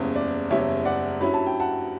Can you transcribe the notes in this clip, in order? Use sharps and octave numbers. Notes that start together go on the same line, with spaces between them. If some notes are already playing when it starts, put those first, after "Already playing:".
Already playing: F#1 E2 C#3 G3 C#5
D5
F#1 E2 C#3 G3 C#5 E5
D5 F#5
G2 F#3 C#4 E4 B5
A5
G5
F#5 A5